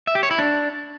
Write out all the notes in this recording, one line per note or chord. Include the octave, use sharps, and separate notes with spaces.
E5
G4
C#5
E4
D4